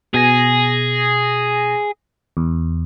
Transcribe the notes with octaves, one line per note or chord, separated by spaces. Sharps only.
B2 G#4 G#5 A#6
E2